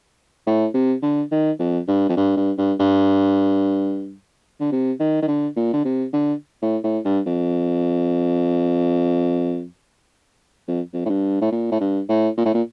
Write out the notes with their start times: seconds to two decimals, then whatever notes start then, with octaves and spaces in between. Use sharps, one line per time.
0.47 A2
0.74 C3
1.02 D3
1.32 D#3
1.59 F2
1.88 G2
2.09 F2
2.17 G2
2.37 G2
2.58 G2
2.80 G2
4.60 D3
4.72 C3
5.00 D#3
5.22 D#3
5.28 D3
5.57 A#2
5.73 D3
5.85 C3
6.13 D3
6.63 A2
6.84 A2
7.05 G2
7.26 F2
10.68 F2
10.93 F2
11.05 A2
11.09 G2
11.41 A2
11.52 A#2
11.72 A2
11.81 G2
12.09 A2
12.37 A#2
12.45 A2
12.54 A#2